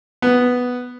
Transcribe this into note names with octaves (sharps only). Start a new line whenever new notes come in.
B3